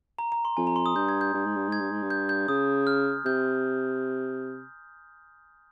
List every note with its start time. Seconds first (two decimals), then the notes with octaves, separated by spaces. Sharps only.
0.19 A#5
0.32 A#5
0.45 C6
0.57 F2 G#5
0.67 A#5
0.76 C6
0.86 D#6
0.95 G2 G6
1.09 G#6
1.21 G6
1.34 G2
1.46 G#2
1.57 G2
1.68 G#2 G#6
1.80 G2
1.91 G#2
2.03 G2
2.10 G6
2.29 G6
2.48 C#3 D#6
2.87 F6
3.25 C3 G6